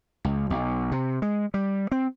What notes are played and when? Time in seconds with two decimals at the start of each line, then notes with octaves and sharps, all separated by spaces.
0.25 C#2
0.50 B1
0.92 C3
1.22 G#3
1.54 G3
1.92 C4